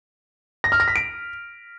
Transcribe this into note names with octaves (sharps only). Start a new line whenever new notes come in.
A#6
F6
A#6
B6
D7